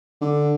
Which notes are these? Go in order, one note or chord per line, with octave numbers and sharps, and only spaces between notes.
D3